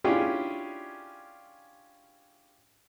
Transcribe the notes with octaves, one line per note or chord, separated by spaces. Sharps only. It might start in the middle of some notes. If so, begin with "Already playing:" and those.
C#4 D4 E4 F4 G4 G#4